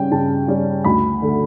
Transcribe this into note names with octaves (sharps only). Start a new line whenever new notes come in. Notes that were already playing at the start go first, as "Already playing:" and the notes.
Already playing: C#3 G3 C#4 G5
C#3 A5
G3 C#4
D2 B5
D3 A3